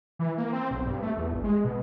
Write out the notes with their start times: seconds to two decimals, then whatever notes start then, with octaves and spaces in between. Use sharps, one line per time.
0.19 E3
0.38 A#3
0.53 C4
0.71 B1
0.86 G2
1.03 A3
1.17 E2
1.31 G1
1.44 G#3
1.64 B2